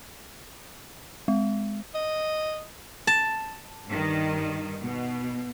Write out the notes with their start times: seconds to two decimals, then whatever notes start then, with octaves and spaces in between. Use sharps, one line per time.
1.28 G#3
1.95 D#5
3.07 A5
3.89 G2 D#3
4.82 B2